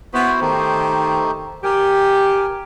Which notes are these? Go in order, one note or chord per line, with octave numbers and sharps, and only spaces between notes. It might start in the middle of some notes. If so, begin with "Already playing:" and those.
B3 E4 F#4 C5
D#3 A3 D#4 G4 C5
G4 A#4 G#5